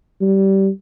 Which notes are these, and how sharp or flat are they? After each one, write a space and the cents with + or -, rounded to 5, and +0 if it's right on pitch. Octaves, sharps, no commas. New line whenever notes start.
G3 -20